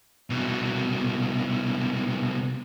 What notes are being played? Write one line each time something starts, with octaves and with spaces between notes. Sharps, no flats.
C2 B2